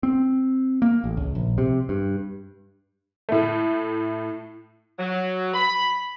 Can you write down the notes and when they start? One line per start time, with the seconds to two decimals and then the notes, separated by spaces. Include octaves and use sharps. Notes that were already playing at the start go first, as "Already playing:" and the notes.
0.03 C4
0.82 A#3
1.04 A1
1.17 C#2
1.35 A#1
1.58 C3
1.89 G2
3.29 A2 A3
4.99 F#3
5.54 B5